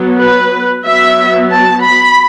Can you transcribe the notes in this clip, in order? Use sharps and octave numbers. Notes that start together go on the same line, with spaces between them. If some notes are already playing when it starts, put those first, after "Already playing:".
Already playing: F#3 B3
B4
F#3 B3 E5
A5
B5